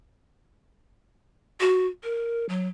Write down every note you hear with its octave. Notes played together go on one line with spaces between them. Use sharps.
F#4
A#4
F#3